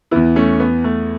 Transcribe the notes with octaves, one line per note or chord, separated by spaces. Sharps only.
E2 E3 B3 E4
A3 C#4
B3
A3